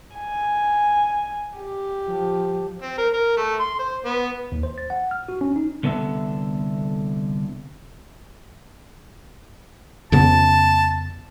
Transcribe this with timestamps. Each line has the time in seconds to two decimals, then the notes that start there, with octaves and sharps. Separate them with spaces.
0.16 G#5
1.58 G4
2.08 F3
2.82 C4
2.98 A#4
3.13 A#4
3.37 A3
3.60 C6
3.79 C5
4.05 B3
4.52 D#2
4.63 C5
4.78 A6
4.90 F#5
5.11 F6
5.28 F#4
5.41 C#4
5.56 D#4
5.83 C2 D3 B3 A4 E5
10.12 F2 C#3 B3 A5